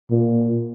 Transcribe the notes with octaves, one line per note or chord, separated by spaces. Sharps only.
A#2